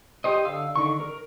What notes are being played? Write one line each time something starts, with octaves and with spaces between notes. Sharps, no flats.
G4 C5 D#5
D3 F5 E6
D3 D#3 C#6
A#4